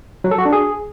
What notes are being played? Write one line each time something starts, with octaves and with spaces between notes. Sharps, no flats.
F#3
A4
F#4
D4
G#4